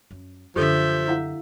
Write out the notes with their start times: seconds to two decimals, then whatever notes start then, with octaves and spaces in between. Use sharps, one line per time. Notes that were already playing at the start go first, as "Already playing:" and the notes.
0.11 F#2
0.56 F#2 D3 F3 G4 A4 E5 G6
1.08 E4 F5 F#5